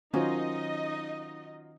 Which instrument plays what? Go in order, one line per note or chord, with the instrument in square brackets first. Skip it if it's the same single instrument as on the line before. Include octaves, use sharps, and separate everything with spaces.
[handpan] D#3 C5 [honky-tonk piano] F#3 F4 [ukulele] C#4 [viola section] D#4 D#5